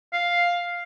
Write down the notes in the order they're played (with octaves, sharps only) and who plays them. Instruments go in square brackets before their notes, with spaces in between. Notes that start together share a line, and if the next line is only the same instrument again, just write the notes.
[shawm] F5